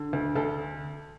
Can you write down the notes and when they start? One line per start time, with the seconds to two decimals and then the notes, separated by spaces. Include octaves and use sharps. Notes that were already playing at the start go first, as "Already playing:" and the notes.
Already playing: D3
0.13 D2
0.36 D2 A4